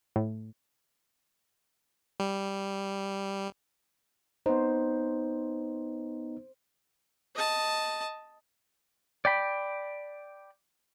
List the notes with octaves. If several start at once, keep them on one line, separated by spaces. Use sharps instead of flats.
A2
G3
B3 D#4 C5
D#5 A5
D5 G5 B5